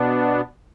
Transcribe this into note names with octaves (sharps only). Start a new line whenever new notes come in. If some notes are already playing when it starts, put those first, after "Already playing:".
Already playing: B2 B3 D4